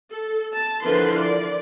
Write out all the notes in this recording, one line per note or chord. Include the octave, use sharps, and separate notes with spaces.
A4
A5
D3 E3 F3 A#4 B4 C6
D5